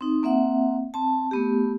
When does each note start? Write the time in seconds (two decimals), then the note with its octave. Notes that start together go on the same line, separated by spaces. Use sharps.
0.01 C4 D#4
0.23 A#3 C4 E5 F#5
0.94 C4 A5
1.31 A3 B3 G4